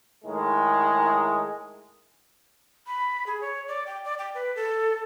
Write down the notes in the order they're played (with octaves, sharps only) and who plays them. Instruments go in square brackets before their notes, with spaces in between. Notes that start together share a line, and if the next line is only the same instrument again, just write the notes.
[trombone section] A2 D#3 G#3
[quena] B5
G#4
C#5
D5
G5
D5
G5
B4
A4